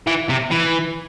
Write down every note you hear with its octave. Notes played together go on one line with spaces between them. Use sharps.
E3
C3
E3